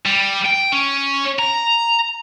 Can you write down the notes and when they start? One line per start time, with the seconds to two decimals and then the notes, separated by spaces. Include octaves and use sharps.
0.06 G3
0.46 G5
0.73 C#4
1.39 A#5